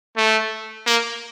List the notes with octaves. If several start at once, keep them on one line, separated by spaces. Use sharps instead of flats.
A3
A#3